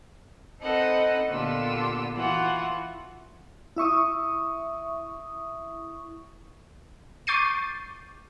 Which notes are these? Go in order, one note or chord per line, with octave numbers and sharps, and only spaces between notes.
C4 D#4 A4 B4 D#5 F#5
A#2 D3 B3 F4 G4 E6
E3 F4 F#4 F#5
E4 E5 C#6 D#6
C#6 D6 G6 A6 C7 D#7